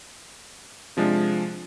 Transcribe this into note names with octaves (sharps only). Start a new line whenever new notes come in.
C3 F3 G#3 D4